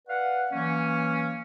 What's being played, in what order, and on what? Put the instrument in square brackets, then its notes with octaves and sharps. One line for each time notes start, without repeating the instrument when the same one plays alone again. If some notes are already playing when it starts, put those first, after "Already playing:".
[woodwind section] B4 D5 F5 F#5
E3 F#3 A#3 C#4